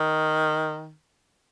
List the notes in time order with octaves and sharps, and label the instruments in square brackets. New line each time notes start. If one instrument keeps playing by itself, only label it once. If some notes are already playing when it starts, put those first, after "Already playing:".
Already playing: [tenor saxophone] D#3